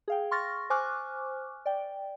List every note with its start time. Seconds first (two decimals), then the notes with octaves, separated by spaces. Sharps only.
0.08 G#4 F5 G5
0.31 C6 C#6 F6 A6 A#6
0.70 C5 G#5 C#6 D6 F6 F#6
1.66 D5 G5